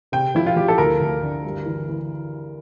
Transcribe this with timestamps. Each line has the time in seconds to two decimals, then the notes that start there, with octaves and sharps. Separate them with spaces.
0.12 C3 G5
0.35 F3 E4
0.46 F4
0.56 F3 G4
0.68 A4
0.78 D2 A#4
1.01 D2
1.22 D3
1.44 G2
1.66 E3
1.89 E3